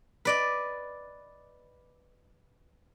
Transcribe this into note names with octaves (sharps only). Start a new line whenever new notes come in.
B4 D5 D#5